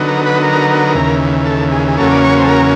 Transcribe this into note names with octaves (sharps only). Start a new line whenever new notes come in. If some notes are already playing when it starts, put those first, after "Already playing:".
Already playing: D3 F#3 B3 D#4
A#4
B4
A#4
D#2 C#3 E3
A4
G#4
G#4
E2 C#3 F#3 A#3 C#4 A4
D5
C#5
C5
A4
A#4